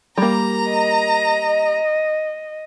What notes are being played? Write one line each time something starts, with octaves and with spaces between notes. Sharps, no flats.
G3 A#3 A#5
D#5